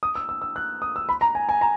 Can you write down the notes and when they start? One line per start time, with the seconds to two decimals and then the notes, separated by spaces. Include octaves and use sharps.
0.03 D#6
0.15 E6
0.29 E6
0.42 E6
0.56 F#6
0.82 D#6
0.96 E6
1.09 B5
1.21 A#5
1.35 G#5
1.49 G#5
1.61 A#5